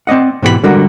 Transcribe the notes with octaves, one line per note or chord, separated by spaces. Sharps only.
C4 D5 D#5 F#5
G#2 B2 E3 G4 G#4 B5
D3 G3 G#3 F#4 A#4